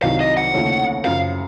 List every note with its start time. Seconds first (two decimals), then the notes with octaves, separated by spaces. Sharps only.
0.03 C2 C3 D#3 F#3 F5
0.20 D#5
0.37 F#5
0.54 D#2 C#3 F3 A3 C#4
1.05 F#2 C#3 F3 F5